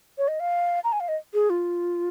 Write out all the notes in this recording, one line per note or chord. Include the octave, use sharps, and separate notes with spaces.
C#5
D#5
F5
A#5
G#5
F5
D#5
G#4
F4